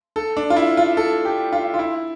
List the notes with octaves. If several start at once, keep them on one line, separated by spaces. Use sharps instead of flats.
A4
D4
F4
E4
F4
A4
G4
F4
F4
E4